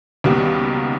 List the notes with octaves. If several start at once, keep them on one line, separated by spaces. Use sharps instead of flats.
C#2 B2 D#3 G3 A#3 B3